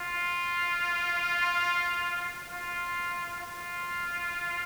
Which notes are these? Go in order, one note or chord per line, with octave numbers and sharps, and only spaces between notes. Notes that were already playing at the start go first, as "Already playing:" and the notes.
Already playing: F4
F4
F4